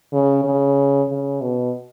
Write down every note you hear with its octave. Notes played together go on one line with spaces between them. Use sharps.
C#3
C#3
C#3
B2